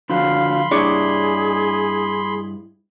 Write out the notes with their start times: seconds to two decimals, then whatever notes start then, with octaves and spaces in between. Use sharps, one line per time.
0.10 D3 F3 F#4 F5 B5 C6
0.71 G2 D4 E4 G#4 C#5 D5